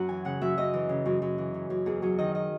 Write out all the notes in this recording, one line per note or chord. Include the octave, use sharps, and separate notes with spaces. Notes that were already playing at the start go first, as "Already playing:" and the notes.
Already playing: F#2 F#5 A#5
E3 G#5
C#3 F#5
F#2 E5
F#2 D#5
E3
C#3
F#2
F#2
E3
C#3
F#2
E2 G#4
F#3 G#4
D#3 D#5
D#5